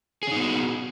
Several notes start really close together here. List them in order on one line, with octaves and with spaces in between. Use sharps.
G#4 C#4 D#4 B3 F#4